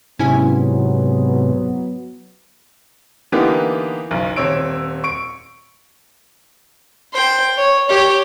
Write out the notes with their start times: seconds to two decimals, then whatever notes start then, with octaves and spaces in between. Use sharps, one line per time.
0.19 G#2 C3 F#3 B3 C#4 E4 G#5
3.32 D3 E3 A#3 B3 D#4 G4
4.11 F#1 B1
4.36 D#1 C4 C#5 E6 D7
5.04 C#6 D7
7.13 C5 G5
7.57 C#5
7.89 G4 C#5